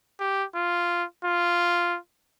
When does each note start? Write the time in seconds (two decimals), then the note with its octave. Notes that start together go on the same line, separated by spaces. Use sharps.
0.20 G4
0.55 F4
1.25 F4